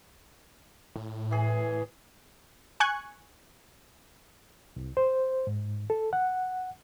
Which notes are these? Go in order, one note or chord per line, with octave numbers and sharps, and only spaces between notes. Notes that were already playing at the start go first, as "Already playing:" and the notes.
A2
E3 G#4
G#5 C#6 F#6 G#6
C2
C5
G#2
A4
F#5